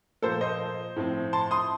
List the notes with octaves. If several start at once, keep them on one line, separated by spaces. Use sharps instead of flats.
A#2 F3 A#3 A4 C5
C5 D#5
A2 F3 C4
A5 C6
C6 D#6